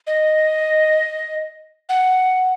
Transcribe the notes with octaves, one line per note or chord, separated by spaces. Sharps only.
D#5
F#5